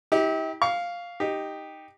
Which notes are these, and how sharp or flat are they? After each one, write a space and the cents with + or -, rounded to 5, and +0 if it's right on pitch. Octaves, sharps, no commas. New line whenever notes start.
E4 -45 G4 +0
F5 +0 C#6 +30
D#4 +0 G4 +5